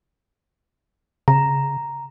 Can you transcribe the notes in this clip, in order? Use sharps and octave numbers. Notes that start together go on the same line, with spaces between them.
C#3 A#5